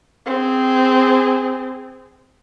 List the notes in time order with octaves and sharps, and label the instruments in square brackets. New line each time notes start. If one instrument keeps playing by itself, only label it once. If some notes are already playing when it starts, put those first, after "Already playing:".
[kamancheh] C4 G#4